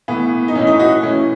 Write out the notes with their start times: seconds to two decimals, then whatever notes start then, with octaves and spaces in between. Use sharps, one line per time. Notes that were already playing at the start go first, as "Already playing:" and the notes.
0.08 A2 E3 B3
0.48 D#4
0.55 A2 E3 C#4
0.67 D#4
0.79 F#4
1.02 A2 E3 C#4